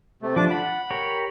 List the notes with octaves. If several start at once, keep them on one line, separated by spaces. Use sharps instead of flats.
C3 A3
F3 D4 D6
F#5 B5
G4 A#4 C#5